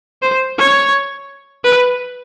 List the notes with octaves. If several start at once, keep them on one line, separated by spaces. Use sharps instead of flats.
C5
C#5
B4